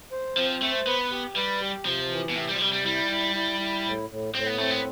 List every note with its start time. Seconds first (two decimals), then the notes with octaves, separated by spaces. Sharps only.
0.12 C5
0.37 F3 C4
0.62 A3 C5
0.86 B3 B4
1.11 G4
1.36 G3 B4
1.61 G4
1.85 C3 F3
2.11 E3
2.30 B2
2.35 A2 C3
2.49 G3
2.54 F3
2.60 C3 G3
2.73 G3
2.85 G3 E4
3.10 E4
3.35 E4
3.60 E4
3.84 A2
4.10 A2
4.34 A2 C4
4.47 B3
4.58 A3 C4
4.71 B3